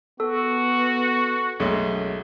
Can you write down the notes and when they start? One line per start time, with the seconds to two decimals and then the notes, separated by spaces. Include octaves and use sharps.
0.20 B3 F#4 A4
1.60 B1 F#2 G#3 A3